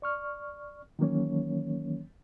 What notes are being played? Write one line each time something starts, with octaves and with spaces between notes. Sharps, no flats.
D5 C#6 F6
D#3 E3 F#3 A#3 C#4 C#5